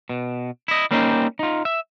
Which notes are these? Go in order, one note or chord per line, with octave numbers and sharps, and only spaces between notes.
B2
E4 D#5
G3 A#3 C4 C#4 D#4
D#4 F4
E5